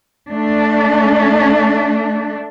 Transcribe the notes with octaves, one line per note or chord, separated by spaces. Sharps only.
A3 D4